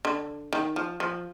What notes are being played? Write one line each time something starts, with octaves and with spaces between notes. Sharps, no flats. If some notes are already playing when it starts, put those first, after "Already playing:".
D3
D#3
F3
F3